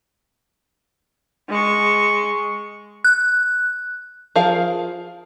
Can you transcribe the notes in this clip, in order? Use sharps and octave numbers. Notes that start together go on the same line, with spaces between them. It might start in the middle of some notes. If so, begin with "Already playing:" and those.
G#3 C#6
F#6
F3 G#4 A#4 F5